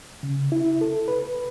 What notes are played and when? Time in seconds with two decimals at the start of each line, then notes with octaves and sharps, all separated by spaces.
0.23 C#3
0.52 E4
0.81 A4
1.08 B4